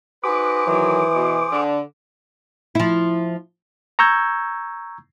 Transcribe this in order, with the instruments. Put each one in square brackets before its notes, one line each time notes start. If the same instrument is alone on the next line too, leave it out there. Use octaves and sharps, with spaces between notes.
[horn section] D#4 F#4 B4 [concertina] G#4 C5 [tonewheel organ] D6
[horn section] D#3 F#3 [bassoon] E3
[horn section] B2
D3
[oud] F3 E4
[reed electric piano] A#5 C#6 E6 G6 G#6